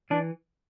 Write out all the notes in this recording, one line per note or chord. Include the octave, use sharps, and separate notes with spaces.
E3 D4